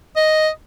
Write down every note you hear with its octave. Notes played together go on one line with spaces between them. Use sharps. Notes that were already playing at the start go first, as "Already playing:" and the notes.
D#5